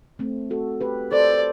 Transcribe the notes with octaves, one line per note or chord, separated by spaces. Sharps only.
A3 C4
F#4 A4
G4 B4
A4 C5 D5